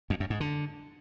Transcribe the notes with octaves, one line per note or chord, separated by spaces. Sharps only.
F2
F#2
G#2
D3